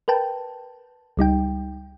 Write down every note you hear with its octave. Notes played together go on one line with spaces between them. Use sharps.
A#4 B4 G5 A5
C#2 G3 D#4 G5